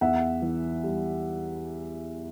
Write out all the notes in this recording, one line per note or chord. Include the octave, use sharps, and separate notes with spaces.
E2 E5 F#5
E3
G3